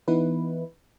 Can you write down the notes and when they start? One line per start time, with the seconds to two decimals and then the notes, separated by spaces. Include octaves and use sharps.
0.08 E3 B3 D#4 E4 B4